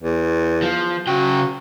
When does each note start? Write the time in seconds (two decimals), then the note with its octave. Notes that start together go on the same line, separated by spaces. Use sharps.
0.03 E2
0.62 F3
1.07 C#3 F#4 G5